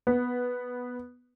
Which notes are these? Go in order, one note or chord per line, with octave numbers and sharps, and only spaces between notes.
B3